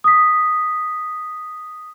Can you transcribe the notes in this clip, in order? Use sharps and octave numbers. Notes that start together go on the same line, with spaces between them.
D#6 B6